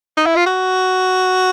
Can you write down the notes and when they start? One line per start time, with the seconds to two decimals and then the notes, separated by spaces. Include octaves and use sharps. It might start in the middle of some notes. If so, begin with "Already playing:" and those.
0.17 D#4
0.26 E4
0.36 F4
0.46 F#4